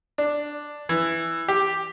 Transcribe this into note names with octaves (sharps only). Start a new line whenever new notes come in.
D4
E3
G4